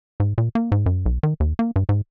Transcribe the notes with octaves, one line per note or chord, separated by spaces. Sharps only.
G#2
A#2
A#3
G#2
F#2
B1
D#3
D#2
A#3
G2
G#2